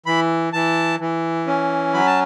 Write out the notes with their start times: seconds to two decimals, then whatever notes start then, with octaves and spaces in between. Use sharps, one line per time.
0.06 E3 B5
0.53 E3 A5
1.00 E3
1.47 C#4
1.94 F#3 B5
2.07 A5